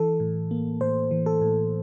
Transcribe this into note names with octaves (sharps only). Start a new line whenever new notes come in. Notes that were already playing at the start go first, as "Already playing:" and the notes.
Already playing: E3 A4
A2
A#3
A2 C5
E3
A4
A2